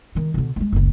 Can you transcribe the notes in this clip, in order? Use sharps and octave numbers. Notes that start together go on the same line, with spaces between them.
D#3 G#3
B2 D3
G3 G#3
F#1 C#2